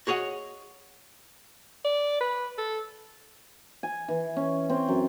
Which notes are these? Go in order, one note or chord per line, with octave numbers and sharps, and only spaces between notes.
F#4 G#4 C#5 D#5 F#5
D5
B4
A4
G#5
E3
C#4
C4
F#2